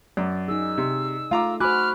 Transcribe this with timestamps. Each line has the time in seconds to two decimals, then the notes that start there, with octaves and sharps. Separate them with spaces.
0.17 F#2 D5
0.48 D#4 G#4 E6
0.78 C3
1.31 A3 F4 A#5 D6
1.60 F#4 C5 G#5 B5 D6 F6 F#6